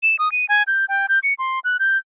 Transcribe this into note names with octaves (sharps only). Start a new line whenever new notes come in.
E7
D#6
D#7
G#5
G6
G5
G6
C#7
C6
F#6
G6